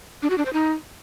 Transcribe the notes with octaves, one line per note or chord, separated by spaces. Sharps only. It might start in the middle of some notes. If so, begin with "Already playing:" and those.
D4
F#4
D4
C5
D#4